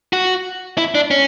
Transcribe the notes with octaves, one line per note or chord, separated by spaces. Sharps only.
F#4
E4
D4
C#4